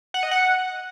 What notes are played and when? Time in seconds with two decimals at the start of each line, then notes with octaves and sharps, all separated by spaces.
0.14 F#5
0.23 D#5
0.31 F#5